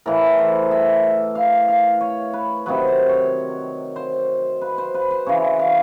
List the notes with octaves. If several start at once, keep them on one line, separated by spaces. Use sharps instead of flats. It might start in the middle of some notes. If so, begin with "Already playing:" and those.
A2 E3 A#4
C5
E5
F5
F5
C#5
B4
C3 D#3 F#3 B4
C5
C#5
C5
B4
C5
B4
C5
C#3 E3 C#5
F5